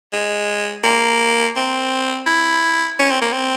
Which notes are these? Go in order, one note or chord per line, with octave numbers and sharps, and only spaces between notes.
G#3
A#3
C4
E4
C#4
C4
A#3
C4